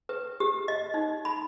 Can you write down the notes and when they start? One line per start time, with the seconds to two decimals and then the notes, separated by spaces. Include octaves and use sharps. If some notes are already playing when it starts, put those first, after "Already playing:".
0.09 B4
0.40 G4
0.68 D#5
0.94 D#4
1.25 B5